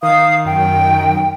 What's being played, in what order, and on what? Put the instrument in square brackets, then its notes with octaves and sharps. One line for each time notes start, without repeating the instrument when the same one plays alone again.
[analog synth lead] D#3 [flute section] F5 D#6
[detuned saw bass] F#2 [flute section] G5